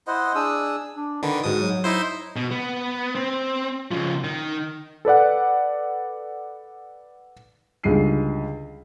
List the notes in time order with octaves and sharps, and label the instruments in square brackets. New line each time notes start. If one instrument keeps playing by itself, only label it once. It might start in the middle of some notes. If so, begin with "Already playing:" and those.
[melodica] E4 C5 D#5 F#5
D4 G#4 D#6 E6
[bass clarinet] D4
[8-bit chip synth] D3 D#3 [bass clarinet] B4
[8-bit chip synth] G#2 D#6 [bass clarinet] F#4
[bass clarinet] F#3
[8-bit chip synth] D#4 E4 C5
[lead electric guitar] B2
B3
C4
C#3 F3
D#3
[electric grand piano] A4 B4 D5 F#5
[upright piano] C#2 D3 G3 D#4 C7 D#7